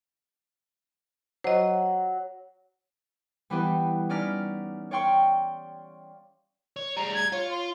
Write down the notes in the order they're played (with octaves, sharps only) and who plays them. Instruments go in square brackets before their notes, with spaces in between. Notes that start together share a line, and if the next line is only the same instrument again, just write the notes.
[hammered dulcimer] F#3 [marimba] C5 D#5
[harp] E3 G3 B3 E4 G4 B4
C#4 D#4 D5 F6 B6
C#5 D5 F5 G5 C6 C#6
[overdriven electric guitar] C#5
[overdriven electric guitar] G3 G#4 [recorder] A#5
[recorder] G#6
[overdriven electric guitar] F4 [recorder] C#5
[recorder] C6